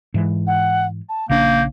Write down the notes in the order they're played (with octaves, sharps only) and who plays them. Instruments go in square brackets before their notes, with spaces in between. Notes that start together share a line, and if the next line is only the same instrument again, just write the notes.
[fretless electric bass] G#2 E3
[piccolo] F#5
A5
[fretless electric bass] A#1 C#3 D4 [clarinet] A#3 [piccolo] G6